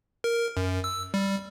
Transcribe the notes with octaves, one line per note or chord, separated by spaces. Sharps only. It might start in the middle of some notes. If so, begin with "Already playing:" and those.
A#4
F#2
E6
G3